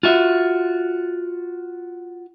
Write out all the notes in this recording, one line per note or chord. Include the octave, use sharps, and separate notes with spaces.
F4 F#4 E5